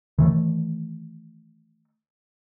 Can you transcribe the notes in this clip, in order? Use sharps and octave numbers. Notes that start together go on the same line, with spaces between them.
D#3 E3 A3